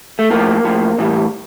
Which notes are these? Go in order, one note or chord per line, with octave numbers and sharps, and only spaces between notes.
A3
A2 F3 A#3
A2 F3
A2 E3 G3